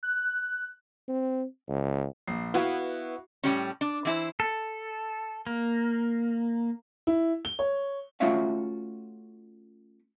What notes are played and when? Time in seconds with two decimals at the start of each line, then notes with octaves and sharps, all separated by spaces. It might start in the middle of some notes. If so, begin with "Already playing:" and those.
0.03 F#6
1.08 C4
1.69 C#2
2.27 A#1 C7
2.54 B3 E4 F#4 F5
3.44 A2 F#3 G3 C#4
3.81 D4
4.05 E3 E4 C5
4.40 A4
5.47 A#3
7.07 E4
7.45 G7
7.59 C#5
8.20 A3 C#4 F4 F#4 E5 F5